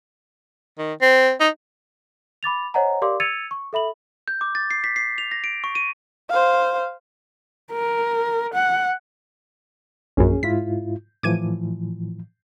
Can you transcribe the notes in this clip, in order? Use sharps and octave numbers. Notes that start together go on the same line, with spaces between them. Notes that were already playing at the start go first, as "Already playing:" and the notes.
D#3
C4
D#4
B5 D6 A6 F7
C5 C#5 D#5 F#5 G#5 A#5
G4 A#4 D5 F5 C6 D6
E6 G#6 A6 C#7 D#7 F7
C#6
A4 E5 B5 F#7
G6
D6
A6
C7
B6
C7
F7
A#6
D7
C#6
D#7
C5 F5
A#4
F#5
A#1 F#2 C#4 G#4
G#2 E4 F4 B6
A2 E3 F3 D6 G#6 D#7